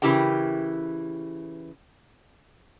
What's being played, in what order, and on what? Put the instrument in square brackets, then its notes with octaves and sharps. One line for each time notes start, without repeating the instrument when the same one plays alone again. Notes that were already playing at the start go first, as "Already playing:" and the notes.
[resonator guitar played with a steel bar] C#3 E3 E4 G4 A#4 G5